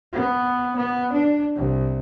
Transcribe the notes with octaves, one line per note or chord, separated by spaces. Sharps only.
B3
B3
D4
C2